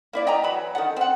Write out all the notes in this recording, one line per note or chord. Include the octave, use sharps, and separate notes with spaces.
A#3 E4 D5
D#5 G5 G#5 A#5
E3 F#3 B5
D#3 A4 F#5
C4 F#5